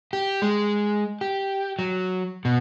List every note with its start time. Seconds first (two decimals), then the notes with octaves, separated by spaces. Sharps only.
0.13 G4
0.42 G#3
1.21 G4
1.79 F#3
2.45 B2